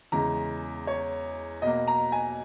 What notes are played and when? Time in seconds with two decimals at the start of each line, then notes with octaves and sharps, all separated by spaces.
0.12 E2 C#3 G#3 A#5
0.87 C#5
1.62 B2 A#3 D#5
1.88 A#5
2.12 G#5